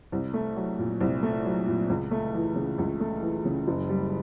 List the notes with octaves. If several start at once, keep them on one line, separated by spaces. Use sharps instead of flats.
C2
A3
F#3
A#2
C2
A3
F#3
A#2
C#2
A3
E3
C#3
C#2
A3
E3
C#3
F#1
G3